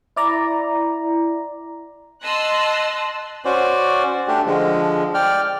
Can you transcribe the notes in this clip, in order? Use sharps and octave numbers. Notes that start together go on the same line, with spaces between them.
E4 D5 A#5
D#5 A5 C6 E6 F#6
C#4 F#4 C5 D5
A3 D4 G4
D3 F3 G#3
D5 G5 F6